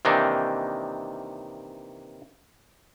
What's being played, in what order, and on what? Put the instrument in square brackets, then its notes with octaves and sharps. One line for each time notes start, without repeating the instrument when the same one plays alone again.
[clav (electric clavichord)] C3 D#3 E3 A#3 D4 D#4